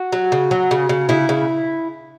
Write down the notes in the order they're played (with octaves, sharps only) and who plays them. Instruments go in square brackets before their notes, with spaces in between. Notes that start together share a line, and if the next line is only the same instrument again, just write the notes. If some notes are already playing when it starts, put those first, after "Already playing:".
Already playing: [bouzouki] F#4
F#3
C#3
F#3
C#3
C#3
C#3 E4
C#3